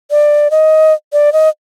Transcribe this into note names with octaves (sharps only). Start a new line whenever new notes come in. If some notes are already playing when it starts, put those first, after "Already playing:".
D5
D#5
D5
D#5